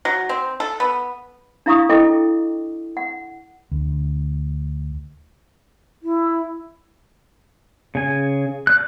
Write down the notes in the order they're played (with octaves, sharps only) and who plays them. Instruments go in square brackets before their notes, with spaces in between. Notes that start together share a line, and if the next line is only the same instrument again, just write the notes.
[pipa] F#3
C4
A4
B3
[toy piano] D4 E4 F5 A#5 C#6 D#6
E4 A4 D#5 G5 D6
F#5
[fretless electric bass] D2
[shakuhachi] E4
[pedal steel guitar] C#3 G#5
D5 F#6